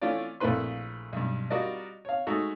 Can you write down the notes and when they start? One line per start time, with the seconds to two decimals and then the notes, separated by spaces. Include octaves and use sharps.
0.02 E3 A3 C#4 F4 C#5 D5
0.40 A#1 A3 A#3 E4 B4 C6
1.13 B1 G2
1.50 G3 F4 F#4 A#4 D5 D#5
2.05 C#5 F5
2.27 G#3 A3 D#4 F#4